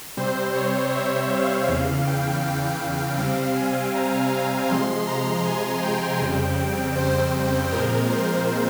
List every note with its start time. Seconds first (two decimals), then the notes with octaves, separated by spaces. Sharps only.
0.17 C3 G3 C4 C5
0.54 C#5
0.93 E5
1.30 F5
1.67 E2 C#3 E3 F5
2.05 G5
2.43 G5
3.18 C3 G3 C4 F5
3.56 G#5
3.94 A#5
4.31 A#5
4.69 C3 F3 G#3 C6
5.07 A#5
5.45 G#5
5.83 G5
6.21 F2 C#3 G3 C4
6.96 C5
7.72 A#2 F3 G#3 C4 A#4
8.10 C5